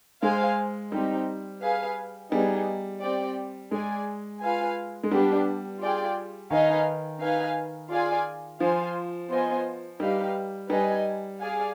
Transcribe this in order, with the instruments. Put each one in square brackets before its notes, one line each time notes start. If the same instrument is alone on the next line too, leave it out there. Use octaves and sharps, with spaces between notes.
[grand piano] G#3 [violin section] G#4 C5 F5 G#5
[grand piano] G3 [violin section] C4 D#4 G4
[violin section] G#4 B4 F5 G#5
[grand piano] G3 [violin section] B3 D#4 G#4 D5
[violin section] C4 G4 D5 G5
[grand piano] G#3 [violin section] G#4 D5 G#5
[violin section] F4 B4 F5 G#5
[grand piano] G#3
[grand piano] G3 [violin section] B3 D4 G4 B4
[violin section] F4 G#4 D5 G5
[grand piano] D#3 [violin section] D#4 B4 F5 G#5
[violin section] D#4 B4 F5 G#5
F4 G#4 D5 F5 G#5
[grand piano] F3 [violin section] F4 C5 F5 G#5
[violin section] B3 F4 C5 D#5 G#5
[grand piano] G3 [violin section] D#4 G4 B4 F5
[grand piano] G3 [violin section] D#4 B4 D#5 G#5
[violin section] G#4 D5 F5 G#5